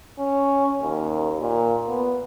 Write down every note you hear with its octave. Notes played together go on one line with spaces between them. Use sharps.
C#4
D#2
A#2
B3